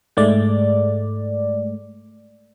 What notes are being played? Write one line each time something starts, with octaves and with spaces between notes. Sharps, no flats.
G#2 G#3 A3 D5